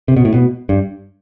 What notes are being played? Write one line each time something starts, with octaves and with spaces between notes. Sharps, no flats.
C3
B2
A2
B2
G2